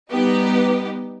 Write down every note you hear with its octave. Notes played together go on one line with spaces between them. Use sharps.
G3 B3 D#4 G4